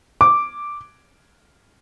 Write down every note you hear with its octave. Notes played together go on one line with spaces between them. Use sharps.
D6